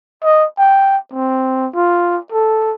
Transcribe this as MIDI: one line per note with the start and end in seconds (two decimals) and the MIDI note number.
0.24 0.45 75
0.59 0.97 79
1.13 1.68 60
1.74 2.18 65
2.32 2.74 69